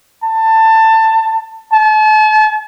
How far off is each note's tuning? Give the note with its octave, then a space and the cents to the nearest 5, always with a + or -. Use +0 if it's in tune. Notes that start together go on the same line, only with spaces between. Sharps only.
A5 +20
A5 -40